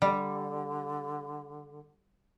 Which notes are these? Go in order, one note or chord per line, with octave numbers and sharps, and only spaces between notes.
D3 G3